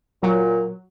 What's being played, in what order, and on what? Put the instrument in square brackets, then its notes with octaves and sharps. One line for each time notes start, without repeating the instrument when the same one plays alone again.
[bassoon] A#2 [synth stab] F#3